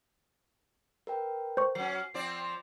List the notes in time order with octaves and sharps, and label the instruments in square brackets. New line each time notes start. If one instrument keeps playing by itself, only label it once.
[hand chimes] A#4 B4 G5
[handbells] C5 C#6
[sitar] F#3 C#4 [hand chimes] C7
[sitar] F3 C4 D5